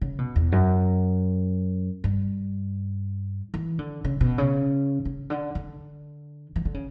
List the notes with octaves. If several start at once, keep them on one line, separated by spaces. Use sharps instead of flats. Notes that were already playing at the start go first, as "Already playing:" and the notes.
C#3
B2
E2
F#2
G2
E3
D3
C#3
B2
C#3
C#3
D3
D3
E3
D3
C#3